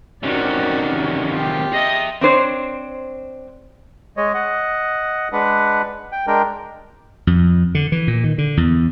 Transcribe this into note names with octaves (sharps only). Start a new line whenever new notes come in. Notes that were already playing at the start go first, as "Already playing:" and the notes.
C3 D#3 C#4 F#4 D5
F4 G4
G#4 D#5 E5
C4 D4 C5 C#5
G#3 C#5 D#5
D#5 F#5
G#3 D4 B4 F#5
G5
G#3 D4 A#4 G5
F2
D3
E3
A#2
D#3
D3
E2